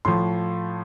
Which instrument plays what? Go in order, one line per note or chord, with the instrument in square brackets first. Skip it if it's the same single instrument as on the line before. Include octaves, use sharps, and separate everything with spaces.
[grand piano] A2 F3 C6